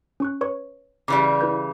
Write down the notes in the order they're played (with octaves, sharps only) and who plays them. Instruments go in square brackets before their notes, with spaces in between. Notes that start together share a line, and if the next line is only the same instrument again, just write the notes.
[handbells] C#4 C#6 F#6
B4 C#5 C#6
[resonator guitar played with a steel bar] C#3 E3 G3 [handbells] D6
[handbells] E4 B4 G6